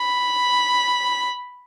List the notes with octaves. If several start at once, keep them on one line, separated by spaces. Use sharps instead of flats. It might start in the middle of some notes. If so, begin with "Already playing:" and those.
Already playing: B5